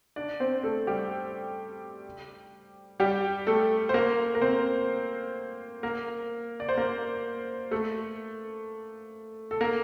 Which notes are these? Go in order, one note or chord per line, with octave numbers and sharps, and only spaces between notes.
D4 D5
C4 C5
A3 A4
G3 G4
G3 G4
A3 A4
C5
A#3 A#4
A#4
C4 C5
A#3 A#4
D5
C5
A#3 A#4
A3 A4
A4
A#3 A#4